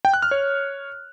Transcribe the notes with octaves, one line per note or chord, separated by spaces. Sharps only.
G5
F#6
F6
C#5